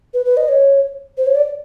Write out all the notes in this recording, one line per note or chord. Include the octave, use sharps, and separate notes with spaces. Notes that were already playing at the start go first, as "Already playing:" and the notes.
B4
B4
D#5
C#5
C5
C#5
D5